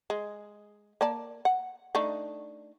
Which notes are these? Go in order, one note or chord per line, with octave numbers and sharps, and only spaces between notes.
G#3
A#3 D5 A5
F#5
A3 D4 D#4